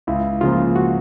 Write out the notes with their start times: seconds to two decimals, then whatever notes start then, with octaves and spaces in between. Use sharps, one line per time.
0.07 C#2 E4
0.41 C#3 F3 A#3 F4
0.76 F#4